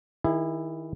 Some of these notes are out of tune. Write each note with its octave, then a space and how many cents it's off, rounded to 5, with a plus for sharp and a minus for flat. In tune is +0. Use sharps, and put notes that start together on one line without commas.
D#3 +15 E4 +0 G#4 -40